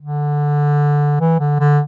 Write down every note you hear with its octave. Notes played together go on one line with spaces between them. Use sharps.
D3
E3
D3
D3